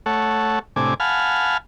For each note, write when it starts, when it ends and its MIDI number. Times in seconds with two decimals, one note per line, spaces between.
0.06 0.59 57
0.06 0.59 69
0.06 0.59 73
0.06 0.59 78
0.76 0.94 45
0.76 0.94 48
0.76 0.94 62
0.76 0.94 80
0.76 0.94 86
1.00 1.57 77
1.00 1.57 78
1.00 1.57 80
1.00 1.57 81
1.00 1.57 83
1.00 1.57 89